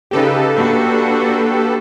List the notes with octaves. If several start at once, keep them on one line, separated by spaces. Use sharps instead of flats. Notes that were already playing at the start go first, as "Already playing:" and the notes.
C#3 D#4 G4 A4 B4
A#3 D4 F#4